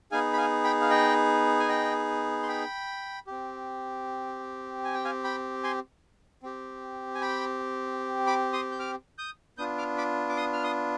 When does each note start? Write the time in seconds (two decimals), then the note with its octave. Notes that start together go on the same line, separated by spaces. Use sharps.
0.12 B3 D#4 G#4 F5 G#5
0.33 B5
0.38 F5 G#5
0.64 G5 B5
0.81 F5
0.90 D#5 G5
1.60 G#5
1.69 D#5 G5
2.43 C6
2.48 G5 B5
3.27 C4 G4
4.85 G#5
4.94 G5
5.05 F5 G#5
5.24 G5 B5
5.64 G#5 C6
6.43 C4 G4
7.15 G#5
7.21 G5 B5
8.27 B5 D6
8.53 C6 D#6
8.72 G6
8.79 D6 F6
9.18 D#6 G6
9.58 B3 D4 F4 D#6 G6
9.78 D6 F6
9.98 B5 D6
10.29 D6
10.37 C6 D#6
10.53 F6
10.63 C6 D#6